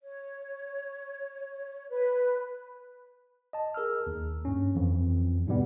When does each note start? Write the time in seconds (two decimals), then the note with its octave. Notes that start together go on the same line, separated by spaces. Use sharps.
0.02 C#5
1.90 B4
3.53 D#5 A5
3.74 G#4 A#4 E6 F6
4.07 D#2
4.45 G2 C#4
4.75 F2 E3
5.47 E2 G#2 B2 G3 B3